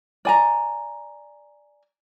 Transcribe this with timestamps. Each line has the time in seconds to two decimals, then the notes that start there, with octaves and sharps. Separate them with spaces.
0.25 D5 G#5 A#5